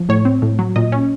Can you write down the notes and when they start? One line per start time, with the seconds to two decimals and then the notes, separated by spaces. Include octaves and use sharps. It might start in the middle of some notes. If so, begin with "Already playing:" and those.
Already playing: F3
0.09 A2 C#5
0.25 C4
0.42 A2
0.59 F#3
0.76 A#2 D#5
0.92 C#4